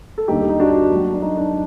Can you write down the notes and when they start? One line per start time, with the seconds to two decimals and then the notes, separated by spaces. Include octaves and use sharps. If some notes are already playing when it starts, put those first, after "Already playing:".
0.18 A4
0.28 D#2 D3 G3 A#3 D#4 G4
0.49 D#4
0.60 D4 F#4
0.91 F#2 F#3 A#3
1.14 D4
1.22 D#4
1.37 D4